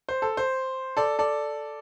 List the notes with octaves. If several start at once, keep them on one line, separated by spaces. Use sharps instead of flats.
C5
A4
C5
A4 D5
A4 D5